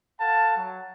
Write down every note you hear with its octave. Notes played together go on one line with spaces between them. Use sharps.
A4 F5 F#5 A5
F#3